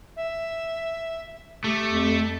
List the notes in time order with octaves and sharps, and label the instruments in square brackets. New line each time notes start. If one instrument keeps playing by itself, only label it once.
[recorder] E5
[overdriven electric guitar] A3 [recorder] G4
[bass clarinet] F2